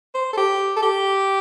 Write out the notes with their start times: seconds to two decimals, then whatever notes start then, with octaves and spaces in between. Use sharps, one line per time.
0.14 C5
0.33 A4
0.37 G4
0.76 A4
0.82 G4